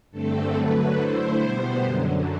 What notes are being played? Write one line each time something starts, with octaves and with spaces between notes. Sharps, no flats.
G2 D3 A3 C4 A4
D3 F#3 A3 B4
D3 A3 E4 C5
B2 G3 B3 C5
F#2 D3 F#3